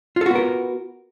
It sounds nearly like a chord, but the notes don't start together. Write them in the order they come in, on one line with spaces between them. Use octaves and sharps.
F4 A4 F#4 B3 A#4